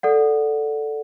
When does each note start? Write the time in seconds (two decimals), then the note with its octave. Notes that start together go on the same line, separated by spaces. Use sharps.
0.03 A4 D5 F#5